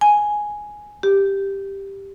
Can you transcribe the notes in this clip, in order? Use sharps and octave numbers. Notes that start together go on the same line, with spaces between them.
G#5
G4